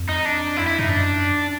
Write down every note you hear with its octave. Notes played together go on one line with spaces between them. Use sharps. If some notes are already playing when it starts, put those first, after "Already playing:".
Already playing: F2
D#4
D4
E4
E4
G2 D#4
F#2 D4